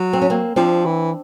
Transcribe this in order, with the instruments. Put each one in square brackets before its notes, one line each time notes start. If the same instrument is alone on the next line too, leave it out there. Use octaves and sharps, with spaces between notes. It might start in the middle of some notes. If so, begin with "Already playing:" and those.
Already playing: [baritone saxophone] F#3
[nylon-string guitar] C4
C#4
A#3 C4
[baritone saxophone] F3 [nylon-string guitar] C4 D4
[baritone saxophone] E3